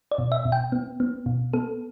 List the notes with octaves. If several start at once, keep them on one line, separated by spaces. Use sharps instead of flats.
D5
B2
E5
B2
G5
B3
B3
B2
B3 A4